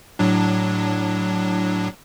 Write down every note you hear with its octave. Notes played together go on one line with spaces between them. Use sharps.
A2 F#3 D4